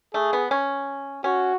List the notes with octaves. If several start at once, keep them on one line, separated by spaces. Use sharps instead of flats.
A3 G#4
B3
C#4
C#4 F#4